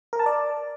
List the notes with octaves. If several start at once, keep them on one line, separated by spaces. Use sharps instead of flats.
A#4
A5
D5